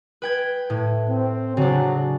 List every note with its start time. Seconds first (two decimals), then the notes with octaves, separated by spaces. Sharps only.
0.22 B4 G5 G#6
0.70 A2
1.10 C4
1.57 C#3 F#3 D4